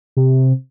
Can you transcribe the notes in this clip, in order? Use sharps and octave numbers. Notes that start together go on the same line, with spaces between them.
C3